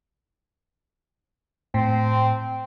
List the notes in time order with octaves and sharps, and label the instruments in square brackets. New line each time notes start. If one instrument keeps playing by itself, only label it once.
[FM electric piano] A2 [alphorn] C4